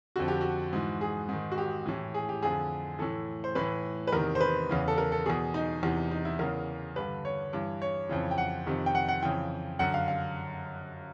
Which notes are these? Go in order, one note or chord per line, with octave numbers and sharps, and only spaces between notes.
F2 D3 F#4
G4
F#4
G#2 E3
G#4
G#2 D#3
F#4
G4
A2 E3
G#4
G4
F2 D3 G#4
A2 E3 A4
C5
A2 E3 B4
B4
E2 C3 D#3 A#4
C5
B4
E2 C#3 E3
A4
A#4
A4
E2 B2 G#4
D#4
E2 C3 E3
D#4
E4
E2 C#3 E3 A#4
G2 D3 B4
C#5
G2 E3
C#5
F2 C#3 E3
G5
F#5
F2 C3 D#3
G5
F#5
F#5
F2 C#3 E3 G5
F#2 D3 F#5
F5
F5